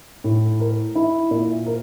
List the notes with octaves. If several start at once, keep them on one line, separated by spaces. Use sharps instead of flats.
A2
A#4
E4
A#2
A#4